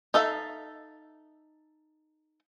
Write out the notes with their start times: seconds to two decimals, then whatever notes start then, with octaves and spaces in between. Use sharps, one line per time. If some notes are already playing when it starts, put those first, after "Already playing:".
0.14 D#4 A4 E5 F5